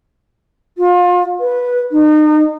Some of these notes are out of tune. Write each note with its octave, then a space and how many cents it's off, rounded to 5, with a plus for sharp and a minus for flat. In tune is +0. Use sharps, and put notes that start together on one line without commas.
F4 +30
B4 -10
D#4 -35